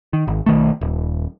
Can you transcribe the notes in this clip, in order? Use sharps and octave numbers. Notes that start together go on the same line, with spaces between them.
D#3
G#1
B1 D#3 A3
D#1